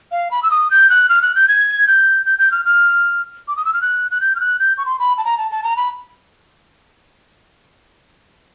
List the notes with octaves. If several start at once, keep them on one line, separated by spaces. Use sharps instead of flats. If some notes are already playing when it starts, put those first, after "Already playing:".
F5
B5
E6
D#6
G6
F#6
F6
F#6
G6
G#6
G6
G6
G6
F6
F6
D6
D#6
E6
F6
F#6
F#6
G6
F6
F#6
G6
C#6
C6
B5
A5
A#5
A5
A5
A#5
B5